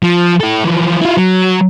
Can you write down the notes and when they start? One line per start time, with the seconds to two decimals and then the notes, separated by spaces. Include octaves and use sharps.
0.03 F3
0.41 E4 A4
0.65 E3 F3
1.01 E4 F4
1.17 F#3